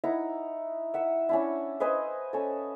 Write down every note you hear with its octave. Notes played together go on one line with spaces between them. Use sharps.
D#4 E4 F#5 A#5
E5 F#5
C#4 D4 E4
B4 C5 D#5 G#5
C#4 A4